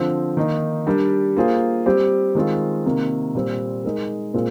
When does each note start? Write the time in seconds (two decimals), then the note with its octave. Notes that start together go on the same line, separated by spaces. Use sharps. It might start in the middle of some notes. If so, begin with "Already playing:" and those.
Already playing: D3 F3 C4
0.37 D#3 A#3 D#4
0.87 G3 D4 G4 A#4
1.37 A#3 F4 G#4 C5
1.86 G3 C4 G4 C5
2.35 D#3 G#3 C4 F4
2.86 C3 D#3 A#3
3.35 A#2 G3 C4
3.85 G#3 D#4 A#4
4.34 A#2 G#3 C4 F4 A#4